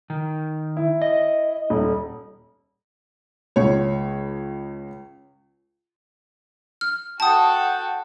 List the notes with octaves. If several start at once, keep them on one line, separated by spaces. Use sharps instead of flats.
D#3
E4
D#5
D#1
C#2 C#5
F6
F#4 A4 F#5 G5 A5 D#6